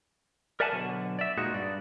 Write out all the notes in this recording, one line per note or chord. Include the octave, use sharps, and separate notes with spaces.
A#4 D5 E5 F#5 G#5 A5
B2 D3 F#3
D5 E5
A#2 G#3 D#4 F#4
G2 D5